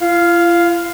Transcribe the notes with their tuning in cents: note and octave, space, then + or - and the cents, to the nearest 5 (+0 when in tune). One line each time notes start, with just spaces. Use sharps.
F4 -45 F5 +0